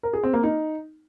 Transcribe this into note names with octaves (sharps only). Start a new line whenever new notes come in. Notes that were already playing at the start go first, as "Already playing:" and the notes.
A#4
G#4
C4
A#3
D#4